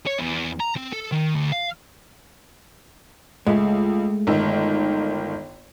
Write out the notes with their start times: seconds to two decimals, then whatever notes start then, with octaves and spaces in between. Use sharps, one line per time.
0.06 C#5
0.19 E2
0.60 A#5
0.76 C4
0.92 A4
1.12 D#3
1.35 D2
1.53 F5
3.47 C#2 G#3 A3
4.27 G1 D#3